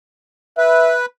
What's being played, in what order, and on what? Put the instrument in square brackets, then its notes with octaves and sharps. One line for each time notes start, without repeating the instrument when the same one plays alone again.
[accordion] B4 [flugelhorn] E5